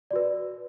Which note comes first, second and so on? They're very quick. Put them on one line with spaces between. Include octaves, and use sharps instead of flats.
D5 F#4 B4